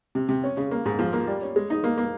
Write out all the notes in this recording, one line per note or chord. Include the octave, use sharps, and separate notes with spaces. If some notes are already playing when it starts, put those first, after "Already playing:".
C3
C3
C#4
C#3
A#3
G#2
F3
A#3
G3
C#4
G#3
D#4
A#3
A#3